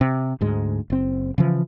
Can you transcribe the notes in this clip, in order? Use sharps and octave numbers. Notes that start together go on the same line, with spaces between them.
C3
D2 G#2 G#3
F#1 C4
C#3 E3 F3